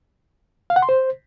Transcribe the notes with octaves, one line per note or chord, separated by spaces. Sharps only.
F5
F#5
C6
C5